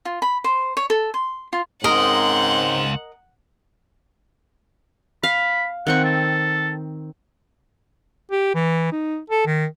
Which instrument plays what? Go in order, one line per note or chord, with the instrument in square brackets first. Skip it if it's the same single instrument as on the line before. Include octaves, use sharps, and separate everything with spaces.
[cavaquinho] F4
B5
C5
C#5
A4
C6
F4
[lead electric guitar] C#2 C6 [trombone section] G#2 C#3 C4 [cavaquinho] A#4 D#5 [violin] F#5
[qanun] F5 [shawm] B5
[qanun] D#3 C4 C#6 [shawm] F#5
[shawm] A4
[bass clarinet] G4
E3
D#4
A4
D#3